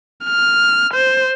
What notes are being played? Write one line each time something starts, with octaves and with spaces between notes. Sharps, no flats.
F6
C5